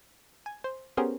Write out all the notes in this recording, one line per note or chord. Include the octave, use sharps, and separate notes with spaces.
G#5
C5
B3 C#4 G4 G#4 A#4 C5